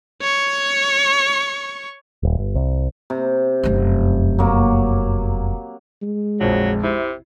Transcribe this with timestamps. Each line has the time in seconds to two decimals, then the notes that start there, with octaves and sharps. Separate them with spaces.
0.22 C#5 C#6
2.23 D#1
2.38 G1
2.55 C2
3.10 C3
3.63 F1 F#2
4.39 F#3 A#3
6.02 G#3
6.40 A#1 F2 F#3
6.83 C3 E4